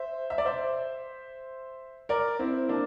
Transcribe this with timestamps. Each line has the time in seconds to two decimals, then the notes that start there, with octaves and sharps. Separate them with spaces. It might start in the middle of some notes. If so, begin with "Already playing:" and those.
Already playing: C5 E5
0.30 E5
0.38 D5
0.45 C5 E5
2.09 A#4 D5
2.39 C4 E4
2.69 A#3 D4